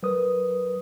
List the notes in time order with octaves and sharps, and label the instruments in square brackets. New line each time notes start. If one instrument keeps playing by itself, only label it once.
[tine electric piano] F#3 A#4 B4 D#6